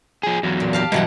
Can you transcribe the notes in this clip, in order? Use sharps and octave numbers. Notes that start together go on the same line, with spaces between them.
F3 G#4
E2 F#3
A#2
G4 F5 A5
G2 B2 E3 F#3 F#5